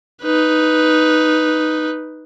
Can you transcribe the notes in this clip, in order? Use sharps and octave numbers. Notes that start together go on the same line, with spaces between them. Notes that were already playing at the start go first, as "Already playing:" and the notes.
D#4 B4